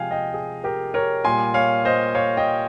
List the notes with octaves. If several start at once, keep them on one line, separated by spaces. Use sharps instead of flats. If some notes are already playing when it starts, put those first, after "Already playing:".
Already playing: C3 F3 G#3 F5 G5 G#5
D#5 G5
G#4
G4 A#4
A#4 C#5
A#2 G3 G#5 C6
C#5 F5
C5 D#5
C#5 F5
D#5 G5